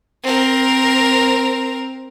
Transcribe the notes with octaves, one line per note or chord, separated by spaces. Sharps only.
C4 A#4